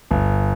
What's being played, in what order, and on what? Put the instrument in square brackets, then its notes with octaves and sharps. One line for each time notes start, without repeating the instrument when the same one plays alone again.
[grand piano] G1